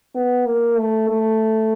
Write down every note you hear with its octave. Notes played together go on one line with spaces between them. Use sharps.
B3
A#3
A3
A3